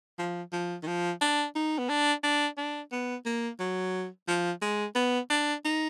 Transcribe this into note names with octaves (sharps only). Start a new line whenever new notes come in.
F3
F3
D#3
F3
D4
D#4
B3
D4
D4
D4
B3
A#3
F#3
F3
G#3
B3
D4
D#4